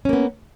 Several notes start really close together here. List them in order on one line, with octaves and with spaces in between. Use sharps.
C#4 A#3 B3